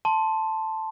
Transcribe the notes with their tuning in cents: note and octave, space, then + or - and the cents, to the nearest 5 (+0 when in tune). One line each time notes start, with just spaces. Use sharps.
A5 +0 C6 +0